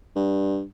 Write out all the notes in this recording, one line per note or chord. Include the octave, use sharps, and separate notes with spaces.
G2